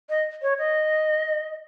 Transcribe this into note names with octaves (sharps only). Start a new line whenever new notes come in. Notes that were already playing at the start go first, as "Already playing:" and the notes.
D#5
C#5
D#5